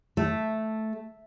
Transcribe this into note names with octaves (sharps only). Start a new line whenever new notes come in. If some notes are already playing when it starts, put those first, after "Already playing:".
A3